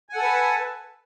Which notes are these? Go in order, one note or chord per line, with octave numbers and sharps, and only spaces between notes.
A4 B4 F#5 G#5 A5